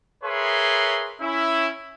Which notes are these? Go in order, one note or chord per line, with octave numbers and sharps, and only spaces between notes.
G#4 A#4 B4 C#5 E5 C6
C#4 E4